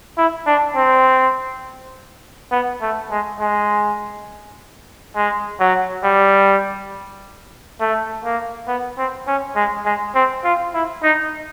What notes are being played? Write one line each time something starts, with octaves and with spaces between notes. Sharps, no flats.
E4
D4
C4
B3
A3
G#3
G#3
G#3
F#3
G3
A3
A#3
B3
C4
C#4
G#3
G#3
C4
F4
E4
D#4